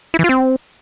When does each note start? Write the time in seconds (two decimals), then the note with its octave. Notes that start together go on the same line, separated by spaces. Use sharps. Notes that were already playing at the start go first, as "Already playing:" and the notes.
0.14 E4
0.19 E3
0.24 F4
0.29 C4